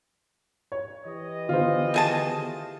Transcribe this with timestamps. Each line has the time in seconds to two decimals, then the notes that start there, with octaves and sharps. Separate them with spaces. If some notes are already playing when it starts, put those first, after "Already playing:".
0.72 C#5
1.05 E3 G4 D#5
1.49 D3 D#3 B3 F4 C5
1.94 A3 G#4 A5